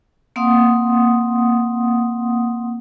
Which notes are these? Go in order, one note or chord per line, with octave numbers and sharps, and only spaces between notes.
A#3 C4 F5 F#5 C6 D#6